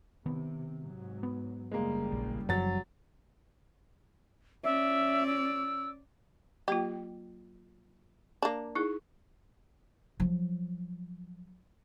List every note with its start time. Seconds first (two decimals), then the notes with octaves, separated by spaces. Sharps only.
0.26 C3 D#3 B3
0.79 G#2 F#3
1.23 B3
1.72 F#1 C#3 G3 G#3 A#3
2.12 A#1
2.49 F#2 F3 F#3 A6
4.64 C#4 D5 E5
5.27 E6
6.68 F#3 A#3 F4 G4
8.42 A#3 D4
8.75 D#4 E4 G#4
10.20 F3 F#3